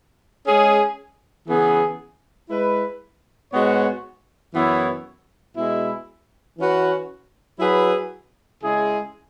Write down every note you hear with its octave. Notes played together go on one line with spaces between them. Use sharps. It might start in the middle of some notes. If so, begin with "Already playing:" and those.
G#3 C#4 G#4
C#3 E3 B3 G#4
G#3 E4 B4
G#2 G#3 B3 F#4 C#5
F#2 E3 B3 E4 C#5
B2 G#3 E4
E3 C#4 F#4 B4
F#3 E4 G#4 B4
C#3 G#3 E4 G#4